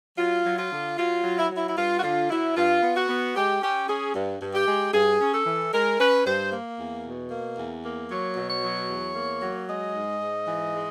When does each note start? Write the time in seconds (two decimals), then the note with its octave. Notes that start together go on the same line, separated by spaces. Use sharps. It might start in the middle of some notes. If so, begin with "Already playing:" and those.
0.18 F#3 F4
0.45 F#3
0.58 F4
0.72 D3
0.98 F#3 F4
1.23 F#3
1.37 E4
1.50 F#3
1.57 E4
1.69 E4
1.76 G2 F4
1.98 F#4
2.03 D3 F4
2.30 F#3 E4
2.56 G2 F4
2.82 B3
2.96 F#4
3.09 B3
3.35 G#3 G4
3.61 C#4 G4
3.88 C#4 G#4
4.14 G2
4.41 G2
4.54 G4
4.67 G#3
4.93 G2 G#4
5.20 C#4
5.33 A4
5.46 E3
5.73 G#3 A#4
5.99 C#4 B4
6.25 G2 C5
6.51 A#3
6.78 E2
7.05 B2
7.30 A#3
7.57 E2
7.83 A#3
8.09 F#3 C#5
8.36 B2
8.49 C#5
8.63 F#3
8.89 E2
9.15 A#3
9.41 F#3
9.68 G#3 D#5
9.95 G#2
10.21 G#2
10.47 E3
10.74 G#3